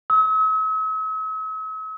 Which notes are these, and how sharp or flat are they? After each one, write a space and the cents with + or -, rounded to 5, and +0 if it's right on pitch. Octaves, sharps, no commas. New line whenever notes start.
E6 -45